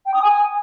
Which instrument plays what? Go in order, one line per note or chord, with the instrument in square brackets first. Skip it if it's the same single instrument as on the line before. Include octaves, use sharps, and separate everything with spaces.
[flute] G5
D#6
G#5